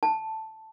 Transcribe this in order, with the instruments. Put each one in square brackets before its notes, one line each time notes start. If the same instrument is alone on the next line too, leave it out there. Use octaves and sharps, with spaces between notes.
[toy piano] A5